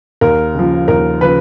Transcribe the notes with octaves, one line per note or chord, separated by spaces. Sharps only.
D#2 A#4
C#3 F3
D#2 A#4
C#3 F3 B4